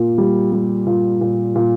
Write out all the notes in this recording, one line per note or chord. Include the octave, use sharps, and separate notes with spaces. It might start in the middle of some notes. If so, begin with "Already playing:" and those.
Already playing: A#2 A#3
G3
G3
A#2
A#2
A#2